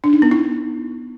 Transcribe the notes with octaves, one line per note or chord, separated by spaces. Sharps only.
D4
D#4
B3
E4